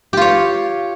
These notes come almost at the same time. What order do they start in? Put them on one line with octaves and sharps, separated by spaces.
G4 F4 C#5